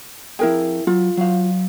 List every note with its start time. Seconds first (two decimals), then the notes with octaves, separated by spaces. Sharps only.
0.39 F2 E4 G#4 A#4 G5
0.87 F#3 F4
1.17 F#3 F5